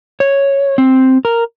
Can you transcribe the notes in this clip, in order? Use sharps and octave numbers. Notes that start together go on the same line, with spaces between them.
C#5
C4
A#4